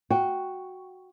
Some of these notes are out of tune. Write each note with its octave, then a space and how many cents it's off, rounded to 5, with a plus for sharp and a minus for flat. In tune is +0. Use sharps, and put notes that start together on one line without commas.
F#4 +0 G5 +0